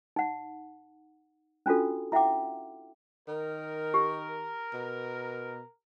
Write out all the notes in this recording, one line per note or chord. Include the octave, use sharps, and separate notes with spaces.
D#4 F#5
C#4 D4 F4 F#4 A4
E4 E5 F#5 G5 D6
D#3 A#4
G4
B2